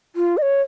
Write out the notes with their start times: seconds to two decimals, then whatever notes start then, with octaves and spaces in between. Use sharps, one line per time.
0.16 F4
0.37 D#5
0.42 C#5